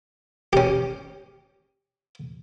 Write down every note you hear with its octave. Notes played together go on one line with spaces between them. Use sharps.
C#4 G4